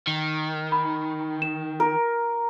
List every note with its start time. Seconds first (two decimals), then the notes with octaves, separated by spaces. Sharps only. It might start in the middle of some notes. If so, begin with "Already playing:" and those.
0.07 D#3
0.72 B5
1.42 E7
1.80 A#4